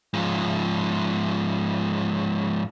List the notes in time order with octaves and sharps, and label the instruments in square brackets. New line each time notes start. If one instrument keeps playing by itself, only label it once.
[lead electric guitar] G#2 F3